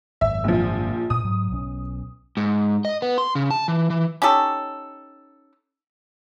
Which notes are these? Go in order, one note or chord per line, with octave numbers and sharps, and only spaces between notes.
G#1 F#2 E5
A#1 F3
A#2 D#6
G#2 F#3
B1 C#4
G#2
D#5
B3
C6
C#3
A5
E3
E3
C#4 D#4 G4 A4